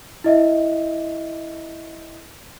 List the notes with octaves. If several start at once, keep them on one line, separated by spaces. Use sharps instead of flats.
E4 D#5 E5